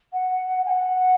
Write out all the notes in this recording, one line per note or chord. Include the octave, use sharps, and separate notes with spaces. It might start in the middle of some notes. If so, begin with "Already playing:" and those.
F#5
G#5
F#5